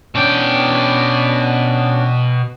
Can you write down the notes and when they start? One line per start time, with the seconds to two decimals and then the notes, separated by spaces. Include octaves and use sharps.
0.15 B2 C#4 D4 D5 G5